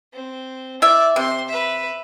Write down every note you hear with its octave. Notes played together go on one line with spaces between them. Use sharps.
C4
E4 D5 E5
C3 C4 C6
B4 E5